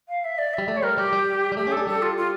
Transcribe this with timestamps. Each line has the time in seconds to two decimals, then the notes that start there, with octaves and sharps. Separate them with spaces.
0.08 F5
0.24 E5
0.38 D5
0.53 E5
0.58 G3
0.68 A3 D5
0.76 C#5
0.83 G3 A#4
0.97 G3 G4
1.13 G3
1.52 G3
1.57 A3 G4
1.67 C#4
1.71 A4
1.77 D4
1.87 G3 A4
2.02 F4
2.17 F4